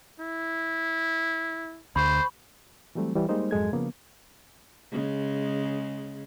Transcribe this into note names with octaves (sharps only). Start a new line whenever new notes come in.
E4
D2 C5 B5 C#6
E3 F#3 G3 A3 C4
E3 G3
G3 G#3 A#3 D#4 C5
F2 G#2 F#3 G#3 A4 G#6
C#3 F3 A#3 B3
C#3 G#3